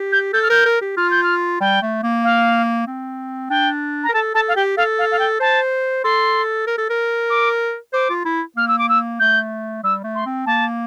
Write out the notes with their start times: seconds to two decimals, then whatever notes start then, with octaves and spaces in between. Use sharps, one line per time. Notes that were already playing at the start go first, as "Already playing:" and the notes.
Already playing: G4
0.12 G6
0.33 A4 G6
0.43 F6
0.50 A#4 G6
0.66 A#4
0.82 G4
0.97 F4 F6
1.11 G6
1.23 F6
1.61 G3 G5
1.82 A3
2.03 A#3
2.24 F5
2.87 C4
3.50 D4 G5
4.04 A#5
4.09 A#4
4.14 A4 A5
4.34 A4 A5
4.48 F5
4.56 G4 G5
4.77 A4 F5
4.99 F5
5.11 F5
5.19 G5
5.40 C5 A5
6.04 A4 C6
6.67 A#4
6.78 A4
6.90 A#4
7.30 D6
7.93 C5 D6
8.10 F4
8.25 E4
8.57 A#3 F6
8.68 E6
8.79 D6
8.89 E6
9.20 A3 G6
9.83 G3 E6
10.04 A3
10.15 C6
10.26 C4
10.46 A#3 A5